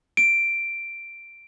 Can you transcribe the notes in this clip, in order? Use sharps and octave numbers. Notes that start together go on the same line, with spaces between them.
D7